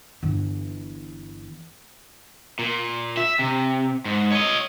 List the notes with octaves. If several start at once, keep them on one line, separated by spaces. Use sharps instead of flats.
G1 E3
A#2
E5
C3
G#2
C#5 D#5